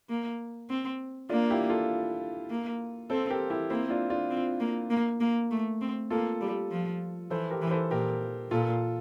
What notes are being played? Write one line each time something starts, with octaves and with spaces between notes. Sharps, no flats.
A#3
C4
A#3 D4 F4
E4 G4
F4 A4
A#3
C4 A4 C5
G4 A#4
E4 G4
A#3 C4 E4
D4 F4
D4 F4
C4
A#3
A#3
A#3
A3
C4
A#3 F4 A4
G3
F3
E3 A4 C5
G4 A#4
E3
A4 C5
A#2 G4 A#4
A#2 F4 A4